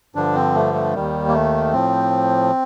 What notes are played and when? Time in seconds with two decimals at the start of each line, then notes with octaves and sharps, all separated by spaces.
0.15 G2 D3 F3 D4
0.35 C4
0.55 A3
0.74 A3
0.94 D#2 D#3 G3
1.28 A#3
1.33 A3
1.72 A2 F3 C4